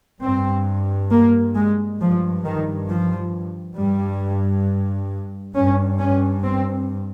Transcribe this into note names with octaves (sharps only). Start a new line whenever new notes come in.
G2 C4
A#3
G#3
G2 F3
D#3
F3
G2 G3
G2 C#4
C#4
C4